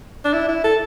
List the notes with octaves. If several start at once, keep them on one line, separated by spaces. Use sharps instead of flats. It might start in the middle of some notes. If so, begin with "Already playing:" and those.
D4
E4
E4
A4